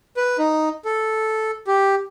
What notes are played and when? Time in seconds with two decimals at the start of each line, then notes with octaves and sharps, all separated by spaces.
0.17 B4
0.39 D#4
0.85 A4
1.67 G4